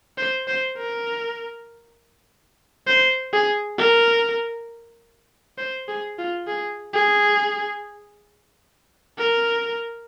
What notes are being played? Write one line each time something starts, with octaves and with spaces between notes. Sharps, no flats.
C5
C5
A#4
C5
G#4
A#4
C5
G#4
F4
G#4
G#4
A#4